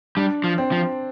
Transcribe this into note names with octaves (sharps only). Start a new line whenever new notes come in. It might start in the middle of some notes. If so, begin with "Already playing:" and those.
G3 D4
F3
C4
F3